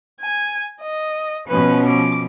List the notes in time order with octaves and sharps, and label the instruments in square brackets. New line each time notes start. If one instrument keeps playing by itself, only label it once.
[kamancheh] G#5
D#5
[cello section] B2 F3 C#4 [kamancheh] B4
[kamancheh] D6